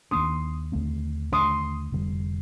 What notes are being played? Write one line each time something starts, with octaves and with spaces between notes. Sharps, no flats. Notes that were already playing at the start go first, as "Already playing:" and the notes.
D#2 D#3 A#3 D4 C6 D#6
D#2 D3 A3 C4
D#2 D3 A3 D4 C6 D#6
F1 F2 D3 G3